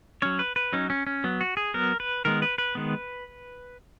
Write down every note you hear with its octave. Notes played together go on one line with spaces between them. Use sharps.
F#3 C#4 C#5
B4
B4
F#3 C#4 D#4
C#4
C#4
F#3 B3
F#4
G#4
F#3 B3 A#4
B4
D#3 G#3 B3 A#4
B4
B4
D#3 G#3 B3